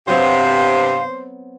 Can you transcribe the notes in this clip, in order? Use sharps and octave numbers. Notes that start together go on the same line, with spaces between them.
G2 C3 F#3 B3 C4 C5 F5